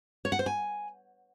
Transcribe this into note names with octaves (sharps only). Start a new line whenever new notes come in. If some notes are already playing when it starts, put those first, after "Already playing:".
C#5
F#5
C5
G#5